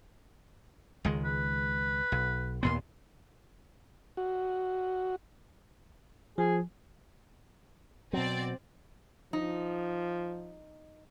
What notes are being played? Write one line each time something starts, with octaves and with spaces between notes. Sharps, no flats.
C#2 D#3 G#3
B4
B1
D#2 A#2 B3 C6
F#4
F3 G#4
B2 F#3 C4 D5
F3 D#4